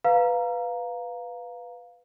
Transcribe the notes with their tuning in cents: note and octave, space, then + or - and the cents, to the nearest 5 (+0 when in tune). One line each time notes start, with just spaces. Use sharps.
B4 +0 F5 +5 A#5 +5